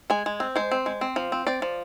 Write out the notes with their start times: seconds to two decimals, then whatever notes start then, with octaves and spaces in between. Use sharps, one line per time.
0.10 G#3 G#5
0.26 G#3
0.40 C4
0.56 G#3 C5
0.71 C4
0.86 G#3
1.01 C4
1.16 F3
1.32 C4
1.47 C4 D5
1.62 F3